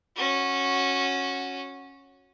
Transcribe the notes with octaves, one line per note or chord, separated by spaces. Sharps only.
C#4 F#4